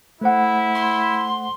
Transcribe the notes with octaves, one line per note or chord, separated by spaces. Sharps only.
A3 E4 C5 F#5
C6